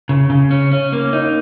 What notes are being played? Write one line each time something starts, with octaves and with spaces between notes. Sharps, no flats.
C#3
C#3
C#4
C#4
A#3
D#4